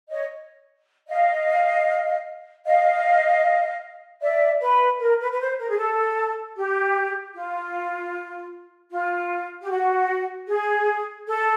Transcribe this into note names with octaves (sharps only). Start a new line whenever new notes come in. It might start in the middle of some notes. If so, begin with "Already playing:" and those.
C#5 D#5
D#5 F5
D#5 F5
D5 E5
B4
A#4
B4
B4
C5
A#4
G#4
A4
G4
F4
F4
G4
F#4
G#4
A4